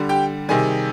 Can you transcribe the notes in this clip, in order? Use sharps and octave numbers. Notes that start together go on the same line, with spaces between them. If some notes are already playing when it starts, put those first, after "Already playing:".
Already playing: D3 G3
G4 G5
C3 D#3 G3 G#4 G#5